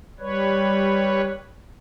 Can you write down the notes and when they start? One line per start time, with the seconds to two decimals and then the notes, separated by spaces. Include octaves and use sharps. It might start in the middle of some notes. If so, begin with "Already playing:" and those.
0.19 G3 B4 C#5